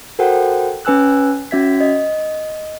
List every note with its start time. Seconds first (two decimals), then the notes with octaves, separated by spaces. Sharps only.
0.19 F#4 A4 A#4 C5 F#5 G5
0.85 C#4 B4 G#5 E6 F#6
1.51 C#4 F#4 E5 G#6 B6
1.81 D#5